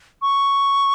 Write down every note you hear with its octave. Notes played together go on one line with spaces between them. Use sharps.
C#6